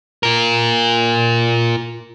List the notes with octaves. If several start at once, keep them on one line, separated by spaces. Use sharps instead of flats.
F4 A#4